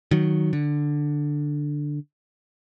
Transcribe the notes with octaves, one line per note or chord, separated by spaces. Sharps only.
D#3 F#3
D3